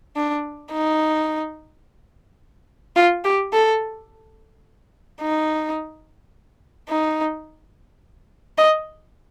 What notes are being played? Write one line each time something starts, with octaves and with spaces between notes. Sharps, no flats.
D4
D#4
F4
G4
A4
D#4
D#4
D#5